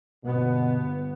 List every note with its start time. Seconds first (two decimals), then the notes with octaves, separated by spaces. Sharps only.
0.25 G1 B2 B3